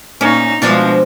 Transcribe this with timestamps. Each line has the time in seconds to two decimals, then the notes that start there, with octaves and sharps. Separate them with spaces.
0.21 A#2 C#4 D#4
0.62 B2 F3 G#3 D4 F4